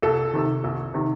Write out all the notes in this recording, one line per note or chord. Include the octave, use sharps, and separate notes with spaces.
C2 A4
C3 D#3
C2
C3 D#3